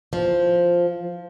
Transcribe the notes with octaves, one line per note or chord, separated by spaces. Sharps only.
F3